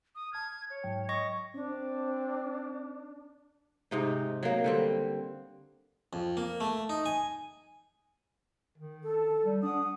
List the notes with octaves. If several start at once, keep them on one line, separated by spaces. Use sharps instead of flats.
D#6
A5 F6 G#6
C#5
G#2 F#3 G5
D#5 C#6 A#6
C4 D4
G#2 C3 D#4
F#3 A#3
D3 G3 C4
F2
A#3
A3
D#4
G#5
D#3
A4
G3
D4 F#5 D#6